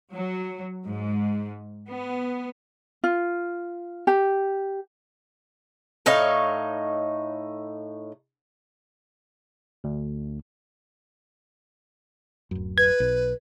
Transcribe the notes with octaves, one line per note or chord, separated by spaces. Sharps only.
F#3
G#2
B3
F4
G4
A2 D#4 C#5 F5
D2
D1 F#2
B4 G#6
B1